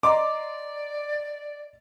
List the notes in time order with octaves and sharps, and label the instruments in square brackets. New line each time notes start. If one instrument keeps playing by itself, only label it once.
[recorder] D5 [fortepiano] D#5 A#5 C6 [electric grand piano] D6